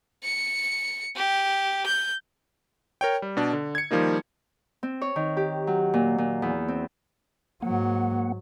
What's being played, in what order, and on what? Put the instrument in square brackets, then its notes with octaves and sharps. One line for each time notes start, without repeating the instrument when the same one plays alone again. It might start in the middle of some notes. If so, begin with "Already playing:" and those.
[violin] C#7
G4
G6
[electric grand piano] A#4 C#5 G5
G3
B2 D4
D3
G#6 C#7
D#3 F3 G3 A#3 D#4
[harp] C4
C#5
D#3
G4
F#3
A#2
A#2
E2
C4
[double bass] G#2 F#3 [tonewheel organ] A#3 F#5